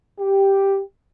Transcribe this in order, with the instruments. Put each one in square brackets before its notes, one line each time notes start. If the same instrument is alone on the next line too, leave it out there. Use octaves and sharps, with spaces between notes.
[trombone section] G4